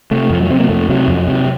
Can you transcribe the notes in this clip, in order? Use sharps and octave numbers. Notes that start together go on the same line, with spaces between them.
C3 A3
F2 F3
F#3
C3 C4
A#3
F2 A3
C3 F#3
F2
C3